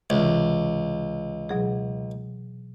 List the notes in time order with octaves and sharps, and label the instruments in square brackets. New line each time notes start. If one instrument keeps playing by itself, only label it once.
[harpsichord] C#2 [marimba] C3 E3
[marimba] B2 F#3 G#4